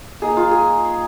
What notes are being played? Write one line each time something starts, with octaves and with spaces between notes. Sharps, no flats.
A#3 D#4 G#4
F4
G#4